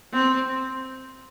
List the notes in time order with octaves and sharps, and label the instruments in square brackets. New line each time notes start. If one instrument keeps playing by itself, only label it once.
[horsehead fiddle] C4